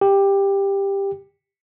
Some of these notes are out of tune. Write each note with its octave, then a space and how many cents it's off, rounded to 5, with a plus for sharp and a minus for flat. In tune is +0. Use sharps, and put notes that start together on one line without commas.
G4 +10